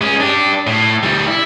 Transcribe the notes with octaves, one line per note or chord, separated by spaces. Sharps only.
G#3 C#4
D4 G4
A2
D2 G3
E4